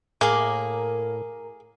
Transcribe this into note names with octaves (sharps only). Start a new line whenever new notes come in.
A2 A#3 G#4 A#4 D6